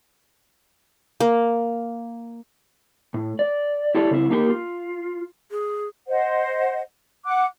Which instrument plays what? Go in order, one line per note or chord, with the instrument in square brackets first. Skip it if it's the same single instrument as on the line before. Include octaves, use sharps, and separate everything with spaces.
[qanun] A#3
[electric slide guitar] A2
D5
E4 G4 A4 C#5 D5
C#3 C4 D#4 E4
A#3 D#4 G4 A#4 D#5 G5
F4
[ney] G#4
[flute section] C5 D#5 F#5
F#5 D6 F#6